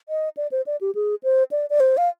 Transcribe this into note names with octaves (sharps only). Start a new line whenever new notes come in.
D#5
D5
C5
D5
G4
G#4
C5
D5
D5
C5
F5